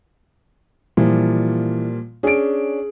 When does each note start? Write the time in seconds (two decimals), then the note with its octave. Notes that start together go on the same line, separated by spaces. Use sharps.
0.97 A#2 E3 F3 G3
2.23 C#4 D4 G#4 D7